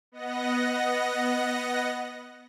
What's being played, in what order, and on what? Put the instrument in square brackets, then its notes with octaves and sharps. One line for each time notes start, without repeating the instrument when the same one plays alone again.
[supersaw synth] B3 D#5 F#5 A#6